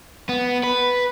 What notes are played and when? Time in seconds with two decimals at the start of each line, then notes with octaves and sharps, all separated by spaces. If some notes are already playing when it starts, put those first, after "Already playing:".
0.29 B3
0.64 B4